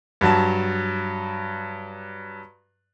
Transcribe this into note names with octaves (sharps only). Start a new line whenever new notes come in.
G2 F#3 A5